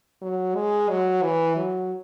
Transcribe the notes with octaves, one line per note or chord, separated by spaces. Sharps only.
F#3
G#3
F#3
E3
F#3